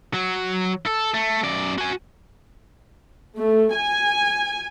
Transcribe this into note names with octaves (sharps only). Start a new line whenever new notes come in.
F#3
A4
A3
F#2 D5
F#4 G#5
A3
G#5